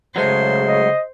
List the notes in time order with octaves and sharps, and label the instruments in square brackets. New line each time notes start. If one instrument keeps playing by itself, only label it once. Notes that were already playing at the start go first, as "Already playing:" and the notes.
[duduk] C#3 [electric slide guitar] F#3 G#3 A3 [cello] C5
[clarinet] D#5